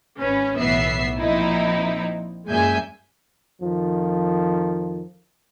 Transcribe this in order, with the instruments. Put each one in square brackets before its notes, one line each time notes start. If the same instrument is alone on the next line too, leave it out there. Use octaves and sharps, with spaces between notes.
[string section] G#1 C#4 B4
B1 A2 E3 B3 E5 C7
A#2 F3 C4 D#4 E4
F#2 A#2 G#3 E5 G#5 G6
[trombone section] F2 D#3 F3